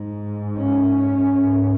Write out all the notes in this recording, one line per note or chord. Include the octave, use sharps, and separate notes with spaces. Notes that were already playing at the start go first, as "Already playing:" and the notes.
Already playing: G#2
C#4
G#2